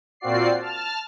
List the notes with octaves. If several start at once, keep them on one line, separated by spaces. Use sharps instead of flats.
A#2 C4 F4 F#4 D5 C7
A5 F6